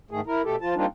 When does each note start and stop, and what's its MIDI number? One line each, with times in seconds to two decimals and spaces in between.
0.11 0.21 44
0.11 0.21 51
0.11 0.21 57
0.11 0.21 68
0.27 0.42 64
0.27 0.42 70
0.44 0.56 47
0.44 0.56 57
0.44 0.56 67
0.44 0.56 69
0.61 0.75 53
0.61 0.75 65
0.61 0.75 81
0.75 0.86 55
0.75 0.86 58
0.75 0.86 60
0.75 0.86 62
0.75 0.86 63
0.75 0.86 65